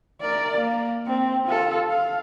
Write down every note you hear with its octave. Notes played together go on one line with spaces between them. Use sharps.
A#4 D5
A#3
C4
F4 A4
F5